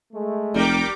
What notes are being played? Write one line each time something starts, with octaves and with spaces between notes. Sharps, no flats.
G#3 A3
F1 G3 A#4 G5 D6